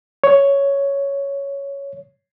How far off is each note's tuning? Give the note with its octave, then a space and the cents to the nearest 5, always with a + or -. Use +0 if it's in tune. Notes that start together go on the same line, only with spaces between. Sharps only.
C#5 +5